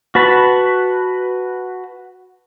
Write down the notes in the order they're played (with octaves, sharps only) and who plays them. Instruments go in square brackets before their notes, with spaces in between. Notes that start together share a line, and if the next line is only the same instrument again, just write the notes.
[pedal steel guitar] F#4 B4 A5 B5